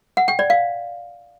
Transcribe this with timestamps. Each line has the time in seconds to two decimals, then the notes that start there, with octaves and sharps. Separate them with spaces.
0.17 F#5
0.28 G5
0.39 D5
0.50 F5